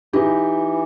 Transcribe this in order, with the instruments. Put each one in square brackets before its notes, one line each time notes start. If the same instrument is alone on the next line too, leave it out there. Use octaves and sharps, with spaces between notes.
[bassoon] E3 [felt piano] D#4 G4